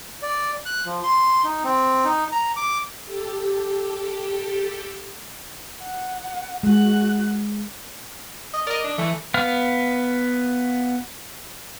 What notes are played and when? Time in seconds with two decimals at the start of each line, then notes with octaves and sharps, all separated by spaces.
0.23 D5
0.66 F#6
0.85 F3
1.03 C6
1.44 D#4
1.64 C4
2.05 D#4
2.32 A#5
2.56 D6
3.06 G4 A4
5.81 F#5
6.63 G#3 F#4 F#6
8.54 D#5
8.67 A#4 D5 D#5
8.84 D4
8.98 E3 A3
9.34 B3 F5